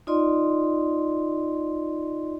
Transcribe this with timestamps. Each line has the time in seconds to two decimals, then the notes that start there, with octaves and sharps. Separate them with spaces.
0.07 D#4 F4 D5 D#5 C6